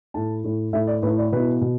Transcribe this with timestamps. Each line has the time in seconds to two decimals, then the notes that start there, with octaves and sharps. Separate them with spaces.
0.14 A2 A3 E4 A5
0.44 A2 A3 E4
0.73 A2 A3 E4 E5
0.87 D5
1.02 A2 A3 E4 B4
1.18 D5
1.32 B2 B3 E4 B4
1.61 B2